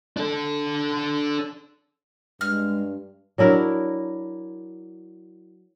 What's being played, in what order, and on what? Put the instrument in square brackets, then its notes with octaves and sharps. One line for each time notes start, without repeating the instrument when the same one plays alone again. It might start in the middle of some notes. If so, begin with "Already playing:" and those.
[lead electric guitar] D4 A4
[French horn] G2 [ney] G#3 [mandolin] F6
[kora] F#3 D4 E4 A#4